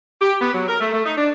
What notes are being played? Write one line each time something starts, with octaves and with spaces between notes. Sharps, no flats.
G4
B3
F#3
A#4
A3
A3
D#4
D4